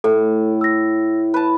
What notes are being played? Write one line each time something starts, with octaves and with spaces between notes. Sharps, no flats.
A2 A4
E6 A#6
B4 A5